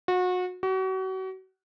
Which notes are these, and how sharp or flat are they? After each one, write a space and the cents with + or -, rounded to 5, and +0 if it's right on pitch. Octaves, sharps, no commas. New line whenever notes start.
F#4 -30
F#4 +35